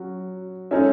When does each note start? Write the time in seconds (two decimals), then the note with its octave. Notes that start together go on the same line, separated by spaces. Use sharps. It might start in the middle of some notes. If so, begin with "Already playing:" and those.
Already playing: F#3 C#4 F#4
0.71 G#3 C#4 D#4 A4 E5